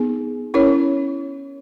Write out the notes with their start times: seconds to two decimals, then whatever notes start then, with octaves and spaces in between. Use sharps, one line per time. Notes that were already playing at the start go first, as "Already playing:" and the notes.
Already playing: B3 D#4 G#4
0.54 C#4 E4 A#4 C#5